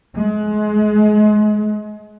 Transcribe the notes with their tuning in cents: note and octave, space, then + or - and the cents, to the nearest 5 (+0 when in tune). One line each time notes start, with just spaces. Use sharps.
G#3 +30